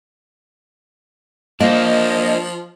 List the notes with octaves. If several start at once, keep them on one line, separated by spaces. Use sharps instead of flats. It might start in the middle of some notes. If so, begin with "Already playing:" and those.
F3 A#3 D4 C5 D#5